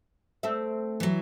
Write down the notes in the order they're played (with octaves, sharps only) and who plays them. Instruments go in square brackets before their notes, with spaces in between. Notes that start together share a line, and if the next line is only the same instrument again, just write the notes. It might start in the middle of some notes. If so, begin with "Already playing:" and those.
[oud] A3 C4 E5
[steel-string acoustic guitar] E3 F#3